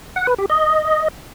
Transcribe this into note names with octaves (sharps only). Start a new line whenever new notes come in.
F#5
B4
G4
D#5